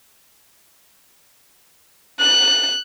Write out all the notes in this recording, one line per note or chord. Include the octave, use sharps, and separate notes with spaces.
F#6